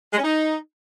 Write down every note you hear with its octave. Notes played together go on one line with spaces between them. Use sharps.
G#3
C#4
D#4